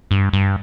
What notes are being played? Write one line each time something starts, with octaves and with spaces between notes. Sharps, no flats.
G2
G2